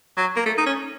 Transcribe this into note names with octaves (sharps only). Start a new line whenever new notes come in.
F#3
A#3
A3
D#4
C#4